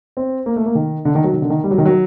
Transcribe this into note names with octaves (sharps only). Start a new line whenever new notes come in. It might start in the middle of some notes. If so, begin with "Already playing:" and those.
C4
A#3
A3
A#3
D#3
D3
D#3
F#3
D#3
D3
D#3
G3
F#3
D#3
F#3